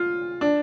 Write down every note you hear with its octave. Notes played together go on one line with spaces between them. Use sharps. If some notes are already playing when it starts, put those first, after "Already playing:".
Already playing: F4
D4